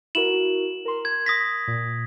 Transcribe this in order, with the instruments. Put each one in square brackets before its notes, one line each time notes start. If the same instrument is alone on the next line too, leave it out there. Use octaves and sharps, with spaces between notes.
[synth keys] E4 F#4 A#4 [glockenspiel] E7 F#7
[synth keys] A#4 C6
[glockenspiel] G#6
D#6 A#6 B6
[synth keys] A#2